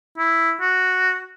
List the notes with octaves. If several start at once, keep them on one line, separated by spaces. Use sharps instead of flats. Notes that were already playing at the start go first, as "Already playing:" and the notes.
E4
F#4